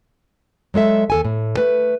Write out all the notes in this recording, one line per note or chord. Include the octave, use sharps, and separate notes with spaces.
F#3 G#3 A4 E5
D#2 A4 G#5
A2
A3 B4